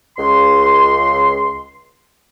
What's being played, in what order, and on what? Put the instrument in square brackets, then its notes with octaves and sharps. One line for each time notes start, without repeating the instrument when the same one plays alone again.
[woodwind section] C#2 C6